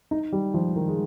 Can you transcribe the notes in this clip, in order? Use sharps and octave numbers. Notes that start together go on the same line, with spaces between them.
D#4
G3
F3
D#3
G#3